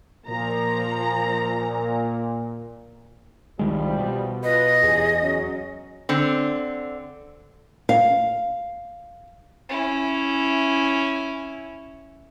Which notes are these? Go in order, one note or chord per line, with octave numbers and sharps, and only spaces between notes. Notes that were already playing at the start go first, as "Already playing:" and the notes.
A#2 F3 A#5
C2 D#3 F3 G3 G#3
B2
F4 B4 D#5
E2 C#4 G4 G#4
F#3 C#4
D3 C4
F5
C#4 E4